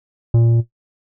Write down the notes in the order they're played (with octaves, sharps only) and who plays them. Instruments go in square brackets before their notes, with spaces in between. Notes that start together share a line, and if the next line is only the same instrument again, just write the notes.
[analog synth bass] A#2